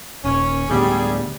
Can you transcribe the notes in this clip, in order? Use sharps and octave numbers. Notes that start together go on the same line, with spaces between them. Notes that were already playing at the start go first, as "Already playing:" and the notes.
D#1 C#4
D2 A2 G3 B3 G#4